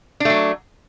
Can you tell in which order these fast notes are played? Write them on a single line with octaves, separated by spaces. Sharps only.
D4 A3 F#3